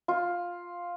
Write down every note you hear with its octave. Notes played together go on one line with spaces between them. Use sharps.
F4